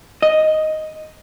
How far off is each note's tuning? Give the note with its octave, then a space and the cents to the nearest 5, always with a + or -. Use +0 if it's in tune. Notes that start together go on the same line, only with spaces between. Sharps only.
D#5 +5